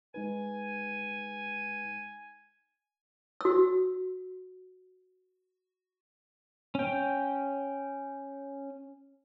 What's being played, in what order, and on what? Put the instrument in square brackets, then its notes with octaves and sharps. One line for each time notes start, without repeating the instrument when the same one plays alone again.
[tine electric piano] G#3 D#4 B4 [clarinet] G#5
[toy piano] F#4 E6
[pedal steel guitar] C#4 G5